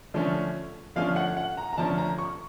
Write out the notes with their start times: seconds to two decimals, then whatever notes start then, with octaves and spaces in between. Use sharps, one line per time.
0.14 D3 F3 A3 C#4
0.96 D3 F3 A3 C#4 F5
1.16 F#5
1.37 F#5
1.57 A#5
1.73 A#5
1.78 D3 F3 A3 C#4 A5
1.98 A#5
2.19 C#6